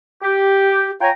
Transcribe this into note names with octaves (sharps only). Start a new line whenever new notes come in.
G4
F4 C#5 G5 G#5 A#5